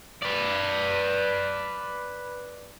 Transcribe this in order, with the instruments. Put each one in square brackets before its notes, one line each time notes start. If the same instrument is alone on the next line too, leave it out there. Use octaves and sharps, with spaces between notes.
[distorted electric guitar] B4 D5